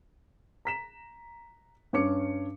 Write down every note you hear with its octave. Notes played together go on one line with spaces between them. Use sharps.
A#5 B6 E7
G2 C#4 C#5 D6 C#7